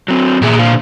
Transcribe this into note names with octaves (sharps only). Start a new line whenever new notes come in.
F#3 C4
A#2 D#3 G#4 E5
D3 C5 F5